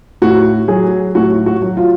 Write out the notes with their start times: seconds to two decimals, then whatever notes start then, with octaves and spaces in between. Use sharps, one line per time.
0.22 A2 F#4
0.68 F#3 G#4
1.15 A2 F#4
1.46 F#4
1.62 F#3
1.77 F4